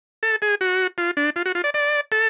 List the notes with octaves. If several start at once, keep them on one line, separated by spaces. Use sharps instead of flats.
A4
G#4
F#4
F4
D4
F4
F#4
F4
D5
D5
A4